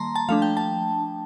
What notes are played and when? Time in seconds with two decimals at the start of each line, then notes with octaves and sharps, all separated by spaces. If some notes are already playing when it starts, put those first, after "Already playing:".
Already playing: D#3 G3 A#3 A5 A#5 C6
0.15 A5
0.29 F3 A3 D4 F5
0.42 G5
0.57 A5